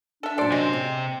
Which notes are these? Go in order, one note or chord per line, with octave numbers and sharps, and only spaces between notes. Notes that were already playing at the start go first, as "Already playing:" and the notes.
D4 A4 E5
F#2 A#2 A4 C5 D5
C3 G#3 C5
C4 G5